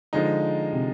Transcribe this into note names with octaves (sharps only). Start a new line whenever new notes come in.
D3 F3 G#3 D#4
C3